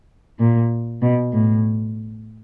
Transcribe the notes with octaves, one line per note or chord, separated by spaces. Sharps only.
A#2
B2
A2